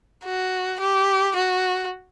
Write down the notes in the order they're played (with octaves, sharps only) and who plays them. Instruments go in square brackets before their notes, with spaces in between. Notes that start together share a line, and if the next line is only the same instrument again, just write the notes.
[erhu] F#4
G4
F#4